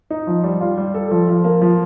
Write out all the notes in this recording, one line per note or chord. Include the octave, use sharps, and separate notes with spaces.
D#4
F3
G3
F4
G3
A4
F3
F3
A#3
F3